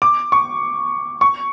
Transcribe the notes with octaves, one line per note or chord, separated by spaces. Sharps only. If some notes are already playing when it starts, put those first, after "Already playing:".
D6
C#6
C#6